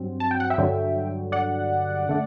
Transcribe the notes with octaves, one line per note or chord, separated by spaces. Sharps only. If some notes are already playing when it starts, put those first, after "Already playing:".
Already playing: G2 F#3 C4
A5
G5
F#5
E5 G5
G2 D3 F#3
D5 F#5
D3 A3